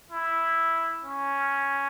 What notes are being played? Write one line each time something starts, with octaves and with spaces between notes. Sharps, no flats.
E4
C#4